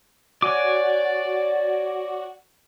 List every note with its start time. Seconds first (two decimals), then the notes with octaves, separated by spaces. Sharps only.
0.42 F#4 C#5 D5 G#5 D6